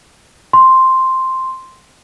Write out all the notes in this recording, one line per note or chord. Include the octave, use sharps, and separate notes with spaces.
C6